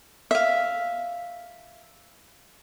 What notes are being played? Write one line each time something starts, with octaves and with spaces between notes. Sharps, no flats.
E5 F5